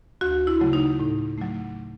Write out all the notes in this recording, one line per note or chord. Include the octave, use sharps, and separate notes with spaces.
D2 F#4
E4
C#3 F#3 A3
D#4
A2
F#3 A3